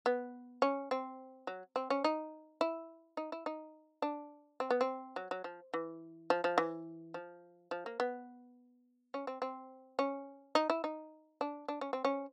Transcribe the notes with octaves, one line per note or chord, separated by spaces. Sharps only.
B3
C#4
C4
F#3
C4
C#4
D#4
E4
D#4
E4
D#4
D4
C4
B3
C4
F#3
F#3
F3
E3
F3
F3
E3
F3
F3
A#3
B3
C#4
C4
C4
C#4
D#4
E4
D#4
D4
D4
C#4
C4
C#4